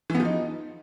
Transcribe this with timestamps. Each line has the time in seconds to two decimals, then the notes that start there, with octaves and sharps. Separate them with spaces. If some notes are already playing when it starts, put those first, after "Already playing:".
0.10 E3
0.15 B3
0.20 F3
0.25 D#4